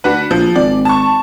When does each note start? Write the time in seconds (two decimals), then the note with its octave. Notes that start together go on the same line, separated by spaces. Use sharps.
0.04 D2 D4 F#4 B4
0.31 A#1 F3
0.56 G#1 D5
0.85 A5 C#6